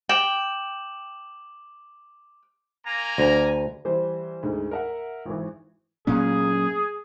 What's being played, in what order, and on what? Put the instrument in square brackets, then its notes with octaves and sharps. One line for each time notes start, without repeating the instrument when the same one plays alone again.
[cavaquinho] G5 [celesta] D6 E7 F#7
[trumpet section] A#3 G#5 A#5
[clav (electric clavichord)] D2
[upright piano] E3 G3 C5
D2 G#2 G#3
A#4 E5 F#5
G#1 E3
[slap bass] A#2 F#3 C#4 [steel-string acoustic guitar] A#3 F5 A#5 [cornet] G#4